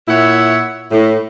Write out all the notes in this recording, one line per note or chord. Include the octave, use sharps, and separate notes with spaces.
A#2 E4 C#5 E5 F#5
A2